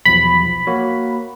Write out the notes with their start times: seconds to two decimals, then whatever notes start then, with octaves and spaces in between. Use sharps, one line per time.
0.05 B1 E2 F3 B5
0.67 A#3 F#4 C#5